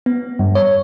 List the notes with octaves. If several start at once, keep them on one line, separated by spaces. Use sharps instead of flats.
B3
G2
C#5